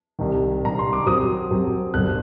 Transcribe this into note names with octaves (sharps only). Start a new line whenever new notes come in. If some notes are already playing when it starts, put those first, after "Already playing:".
C2 C3 D#3
C2 C3 D#3 A#5
C6
D6
F#2 F#3 C4 D#6
F#2 F#3 C4
G1 F#2 D3 F#6